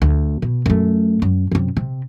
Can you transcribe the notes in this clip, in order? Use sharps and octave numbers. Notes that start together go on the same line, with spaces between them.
D2
B2
F#2 A3
F#2
F#2 C3
C3